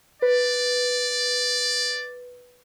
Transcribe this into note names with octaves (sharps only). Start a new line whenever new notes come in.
B4 D5